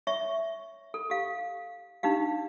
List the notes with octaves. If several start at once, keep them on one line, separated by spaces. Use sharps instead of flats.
C#5 E5 C#6
A4
G4 F5
D4 D#4 G4 F5